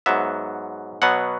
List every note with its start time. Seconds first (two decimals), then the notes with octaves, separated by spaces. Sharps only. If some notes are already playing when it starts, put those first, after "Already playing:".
0.06 G#2 F#3 B3 E5
1.02 B2 F#3 B3 F#5